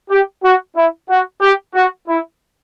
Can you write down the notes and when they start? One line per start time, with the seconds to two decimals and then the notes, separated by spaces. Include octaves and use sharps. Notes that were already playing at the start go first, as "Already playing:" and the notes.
0.10 G4
0.44 F#4
0.75 E4
1.09 F#4
1.41 G4
1.75 F#4
2.07 E4